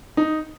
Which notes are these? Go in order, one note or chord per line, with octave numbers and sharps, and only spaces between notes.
D#4